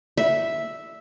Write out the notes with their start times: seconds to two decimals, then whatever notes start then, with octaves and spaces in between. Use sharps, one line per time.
0.18 E5